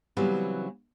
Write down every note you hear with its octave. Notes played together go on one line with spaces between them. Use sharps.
C#3 E3 F#3 G3 B3 C4